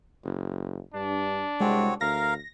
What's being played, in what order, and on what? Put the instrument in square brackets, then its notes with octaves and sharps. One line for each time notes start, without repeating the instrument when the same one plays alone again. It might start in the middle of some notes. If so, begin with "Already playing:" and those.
[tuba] F#1
[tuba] G2 [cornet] D4
[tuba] C2 [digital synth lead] G#3 [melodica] C4 F#4 C#5
[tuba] D2 [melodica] A#4 F5 [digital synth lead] A#6